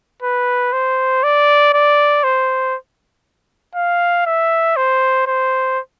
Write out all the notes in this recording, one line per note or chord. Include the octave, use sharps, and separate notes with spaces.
B4
C5
D5
D5
C5
F5
E5
C5
C5